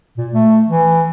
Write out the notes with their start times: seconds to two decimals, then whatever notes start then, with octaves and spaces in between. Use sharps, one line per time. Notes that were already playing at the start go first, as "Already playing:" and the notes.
0.17 A#2
0.33 A3
0.69 E3